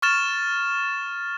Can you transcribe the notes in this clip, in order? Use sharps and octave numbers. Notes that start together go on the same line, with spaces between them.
C#6 F6 A6 E7